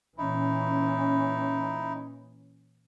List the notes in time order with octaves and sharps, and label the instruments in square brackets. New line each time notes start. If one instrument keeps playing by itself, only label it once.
[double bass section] A#2 E3 C#4 [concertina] D#4 E4